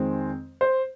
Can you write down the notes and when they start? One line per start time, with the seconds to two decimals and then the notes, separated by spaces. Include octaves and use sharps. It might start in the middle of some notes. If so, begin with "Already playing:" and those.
Already playing: F2 D#3 G#3 C4
0.61 C5